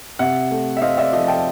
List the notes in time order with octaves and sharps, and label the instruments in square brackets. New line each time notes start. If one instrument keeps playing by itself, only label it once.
[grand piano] C3 E5 F#5
A3
E5
C4 D#5 F5
D5 E5
F3 D#5 F5
G5 A5